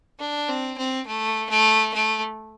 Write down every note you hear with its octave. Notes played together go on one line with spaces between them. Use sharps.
D4
C4
C4
A3
A3
A3